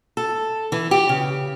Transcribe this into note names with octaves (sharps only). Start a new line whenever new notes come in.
A4
E3
G4
C#3